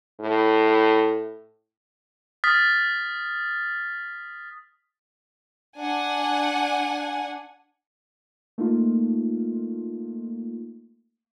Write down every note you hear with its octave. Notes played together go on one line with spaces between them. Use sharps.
A2
D#6 F6 A6 B6
D4 F#5 G#5
A3 A#3 D#4 F4